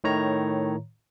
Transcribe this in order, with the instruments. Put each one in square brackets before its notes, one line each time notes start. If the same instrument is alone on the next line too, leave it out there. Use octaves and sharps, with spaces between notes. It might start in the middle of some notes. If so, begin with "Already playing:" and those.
[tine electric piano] A2 D#3 C#5 A#5